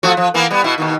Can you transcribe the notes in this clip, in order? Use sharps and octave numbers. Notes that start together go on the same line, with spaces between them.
F3 A3 F#4
F3
E3 A#3 B3
G3 B3
B2 E4
D#2 B2 D#3